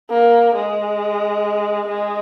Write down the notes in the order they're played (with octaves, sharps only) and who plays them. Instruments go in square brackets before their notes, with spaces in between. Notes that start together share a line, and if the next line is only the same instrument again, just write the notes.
[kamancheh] A#3
G#3
G#3